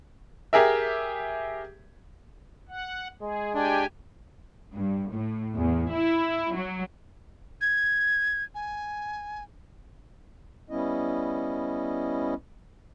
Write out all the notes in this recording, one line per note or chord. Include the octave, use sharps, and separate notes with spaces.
G4 G#4 A#4 E5
F#5
G#3 G#4
D4 G4 G5 G#5
G2
A2
E2
E4
F#3
G#6
G#5
G3 B3 C#4 E4 D#5